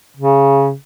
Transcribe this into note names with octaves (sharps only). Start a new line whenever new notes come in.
C#3